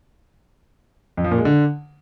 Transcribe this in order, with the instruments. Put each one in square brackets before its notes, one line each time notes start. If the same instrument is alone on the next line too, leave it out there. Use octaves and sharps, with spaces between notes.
[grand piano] F2
F3
A#2
G#3
D3